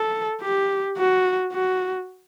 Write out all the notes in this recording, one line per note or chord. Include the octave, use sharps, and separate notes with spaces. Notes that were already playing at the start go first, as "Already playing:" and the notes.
Already playing: A4
G4
F#4
F#4